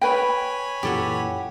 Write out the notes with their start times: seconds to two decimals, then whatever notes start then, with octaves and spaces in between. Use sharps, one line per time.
0.01 B4 C#5 G5 G#5 B5
0.83 F#2 A#2 E3 G4 A4 F#5